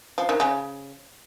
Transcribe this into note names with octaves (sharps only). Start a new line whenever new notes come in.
F3
D#3
C#3